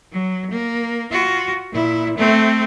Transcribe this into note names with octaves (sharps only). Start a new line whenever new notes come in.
F#3
A#3
F4 F#4
A#2 E4
A3 C4